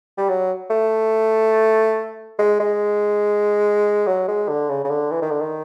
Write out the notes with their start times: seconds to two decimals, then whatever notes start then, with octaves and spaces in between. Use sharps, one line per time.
0.18 G3
0.29 F#3
0.70 A3
2.39 G#3
2.60 G#3
4.07 F#3
4.28 G#3
4.49 D3
4.70 C#3
4.84 C#3
4.90 D3
5.12 E3
5.22 D#3
5.31 D3
5.41 D#3